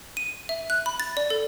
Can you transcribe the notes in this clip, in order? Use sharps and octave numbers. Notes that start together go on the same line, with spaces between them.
D#7
E5
F#6
B5
A6
D5
A4